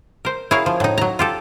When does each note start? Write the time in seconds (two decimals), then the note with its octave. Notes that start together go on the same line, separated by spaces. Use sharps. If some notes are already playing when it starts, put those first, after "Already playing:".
0.25 A#4 C5
0.51 E4 F#4 G#4 A#4 C#5 F5
0.66 F3
0.80 A2 D#4
0.98 F#3 A#5
1.19 F4 G4 A4